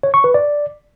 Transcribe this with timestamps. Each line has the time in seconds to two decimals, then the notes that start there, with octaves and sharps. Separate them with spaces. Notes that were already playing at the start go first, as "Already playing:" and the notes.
0.03 C#5
0.14 C#6
0.24 B4
0.34 D5